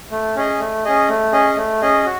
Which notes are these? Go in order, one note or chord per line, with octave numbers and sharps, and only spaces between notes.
A3
C#4 G#4 D#5
A3
C#4 G#4 D#5
A3
C#4 G#4 D#5
A3
C#4 G#4 D#5
F#4